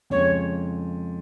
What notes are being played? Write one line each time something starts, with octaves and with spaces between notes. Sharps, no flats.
F2 C#3 G#3 C#5